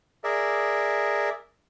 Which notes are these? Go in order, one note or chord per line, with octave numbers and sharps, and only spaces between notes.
G#4 A#4 D5 E5